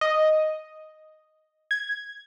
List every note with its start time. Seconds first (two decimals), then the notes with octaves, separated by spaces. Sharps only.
0.01 D#5
1.71 G#6